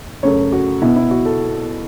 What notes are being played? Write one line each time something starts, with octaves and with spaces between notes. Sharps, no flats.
F#2 C#3 A3 C#5
F#4
B2 B3 E4
E4
F#4
A4